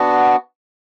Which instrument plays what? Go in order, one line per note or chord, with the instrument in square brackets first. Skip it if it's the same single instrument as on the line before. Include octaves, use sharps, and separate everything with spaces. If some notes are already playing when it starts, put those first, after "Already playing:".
Already playing: [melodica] B3 D4 F#4